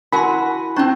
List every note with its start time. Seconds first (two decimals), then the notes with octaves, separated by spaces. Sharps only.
0.12 E4 F#4 A#4 F#5 G#5 B5 C6
0.76 C4 C#4 D#4 C5 C#6